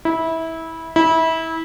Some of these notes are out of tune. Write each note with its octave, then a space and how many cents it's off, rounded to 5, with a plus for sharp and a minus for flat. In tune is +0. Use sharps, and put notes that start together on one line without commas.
E4 -20
E4 -25